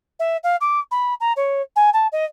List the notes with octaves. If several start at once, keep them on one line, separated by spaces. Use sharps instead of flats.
E5
F5
D6
B5
A#5
C#5
G#5
A5
D#5